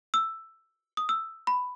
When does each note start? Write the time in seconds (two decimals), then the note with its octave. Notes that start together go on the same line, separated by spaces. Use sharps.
0.14 E6
0.97 D#6
1.09 E6
1.47 B5